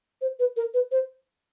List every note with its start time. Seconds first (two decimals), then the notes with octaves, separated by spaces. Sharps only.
0.21 C5
0.39 B4
0.57 A#4
0.74 B4
0.92 C5